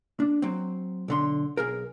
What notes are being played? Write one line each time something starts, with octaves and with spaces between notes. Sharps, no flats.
D4
F#3 C4
B1 D3 C6
B1 G#4 A#4